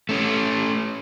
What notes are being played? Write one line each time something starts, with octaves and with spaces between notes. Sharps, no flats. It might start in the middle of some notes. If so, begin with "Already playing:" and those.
A3 C#4